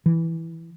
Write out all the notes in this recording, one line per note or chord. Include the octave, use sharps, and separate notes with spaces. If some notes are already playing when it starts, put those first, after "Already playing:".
E3